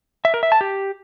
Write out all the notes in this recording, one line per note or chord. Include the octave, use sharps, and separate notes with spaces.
E5
A#4
E5
A5
G4